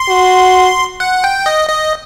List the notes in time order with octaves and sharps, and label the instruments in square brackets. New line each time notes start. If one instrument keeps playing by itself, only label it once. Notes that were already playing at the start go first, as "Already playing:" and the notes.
Already playing: [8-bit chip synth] C6
[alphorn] F#4
[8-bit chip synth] F#5
G5
D#5
D#5